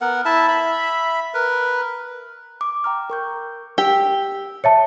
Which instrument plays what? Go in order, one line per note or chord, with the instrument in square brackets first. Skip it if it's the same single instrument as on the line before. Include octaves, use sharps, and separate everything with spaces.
[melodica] B3 A#4 F#5
E4 E5 A5
E5 B5
A#4 B4
[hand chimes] D6
G5 A#5 F6
A#4 C#6 G6
[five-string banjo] G4 [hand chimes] E6 D7
[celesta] C#5 E5 A5 [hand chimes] C#7